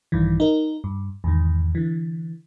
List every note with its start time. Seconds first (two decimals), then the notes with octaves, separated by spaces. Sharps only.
0.12 A#1 G2 D#3 E3
0.40 D#4 A#4
0.84 G2
1.24 E2 G#2 D#3
1.75 D3 E3